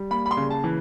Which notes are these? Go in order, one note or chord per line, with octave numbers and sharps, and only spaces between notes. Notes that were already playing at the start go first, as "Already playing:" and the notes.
Already playing: G3
A#3 B5
B5
C6
C#3
A5
E3